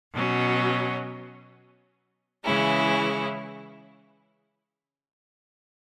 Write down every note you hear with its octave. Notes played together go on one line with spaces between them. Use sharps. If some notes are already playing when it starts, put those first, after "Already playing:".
B2 F#3 C#4
C#3 E3 G#3 C#4 E4